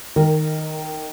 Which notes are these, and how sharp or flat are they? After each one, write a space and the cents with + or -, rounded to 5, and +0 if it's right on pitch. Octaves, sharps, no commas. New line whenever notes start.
D#3 +0 A#4 -25